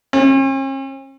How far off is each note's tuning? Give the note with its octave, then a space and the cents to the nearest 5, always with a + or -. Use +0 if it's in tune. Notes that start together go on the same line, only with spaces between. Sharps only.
C#4 -45